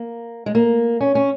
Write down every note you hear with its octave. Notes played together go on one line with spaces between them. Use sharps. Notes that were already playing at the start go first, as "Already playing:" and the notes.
Already playing: A#3
G#3
A#3
C#4
C#4